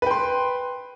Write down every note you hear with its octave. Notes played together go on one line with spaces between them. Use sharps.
B4 G5 C6